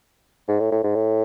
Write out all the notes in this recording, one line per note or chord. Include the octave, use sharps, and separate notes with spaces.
G#2
A2
A2
G#2
A2